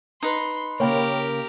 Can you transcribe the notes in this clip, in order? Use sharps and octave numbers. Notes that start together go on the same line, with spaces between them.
D#4 B4 C6
C#3 A#3 G4 A#4 C#5 G5